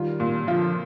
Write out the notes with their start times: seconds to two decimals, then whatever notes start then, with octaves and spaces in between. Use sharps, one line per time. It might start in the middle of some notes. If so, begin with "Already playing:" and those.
Already playing: D#3 G3 F4
0.20 A#2
0.47 D3 F3 F4